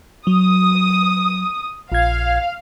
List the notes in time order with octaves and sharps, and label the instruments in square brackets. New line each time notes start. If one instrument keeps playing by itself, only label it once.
[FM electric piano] F#3 [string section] D#6
[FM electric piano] A#1 G#6 [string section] F5